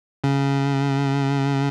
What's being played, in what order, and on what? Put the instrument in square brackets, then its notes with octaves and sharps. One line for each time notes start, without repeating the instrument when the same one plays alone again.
[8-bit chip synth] C#3